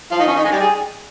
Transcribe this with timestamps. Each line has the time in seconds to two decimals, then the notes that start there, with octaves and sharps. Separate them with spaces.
0.11 F3 F4
0.19 D#3 D#4
0.27 C#4
0.36 D#3 D#4
0.45 G#3 G#4
0.52 G3 G4
0.60 G#4